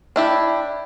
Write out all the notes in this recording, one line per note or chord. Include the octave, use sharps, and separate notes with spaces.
D4 E4 G4